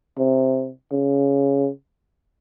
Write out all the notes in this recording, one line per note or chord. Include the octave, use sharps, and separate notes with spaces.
C3
C#3